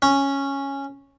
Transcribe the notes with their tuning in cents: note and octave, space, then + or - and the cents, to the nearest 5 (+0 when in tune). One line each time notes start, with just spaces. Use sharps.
C#4 -5